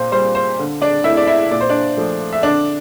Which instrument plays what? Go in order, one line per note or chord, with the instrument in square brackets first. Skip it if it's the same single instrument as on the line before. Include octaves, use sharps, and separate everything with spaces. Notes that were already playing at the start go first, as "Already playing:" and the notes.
Already playing: [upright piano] A#2 C5
G3 C5
C5
D3
D4 D5
A3 E4 E5
D5
E4 E5
A#2 D5
C5
D4 D5
F3 A3
E5
D3 D4 D5